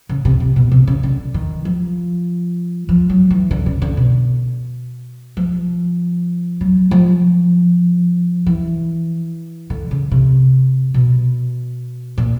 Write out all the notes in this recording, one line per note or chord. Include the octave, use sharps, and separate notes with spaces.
C#3
C3
C3
B2
C3
C#3
D3
D#3
F3
F3
F#3
E3
D3
C#3
D3
B2
F3
F#3
F3
E3
D3
C#3
C3
B2
A#2